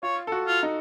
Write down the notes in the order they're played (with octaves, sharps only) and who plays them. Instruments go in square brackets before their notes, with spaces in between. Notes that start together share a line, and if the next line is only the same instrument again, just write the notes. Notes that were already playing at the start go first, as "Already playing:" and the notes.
[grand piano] F4 [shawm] C#5
[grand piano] A4
F#4
[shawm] F4
[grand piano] D#4